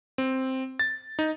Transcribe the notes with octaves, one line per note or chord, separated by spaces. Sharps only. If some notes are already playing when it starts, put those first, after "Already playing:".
C4
A6
D#4